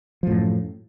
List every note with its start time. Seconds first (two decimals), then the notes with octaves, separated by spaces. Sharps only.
0.23 F3
0.27 A2
0.31 F#2